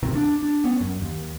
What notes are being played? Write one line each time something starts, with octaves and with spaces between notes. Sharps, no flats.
D2 G#2 C3 D#3
D4
D4
B3 C#4
F#2
D#2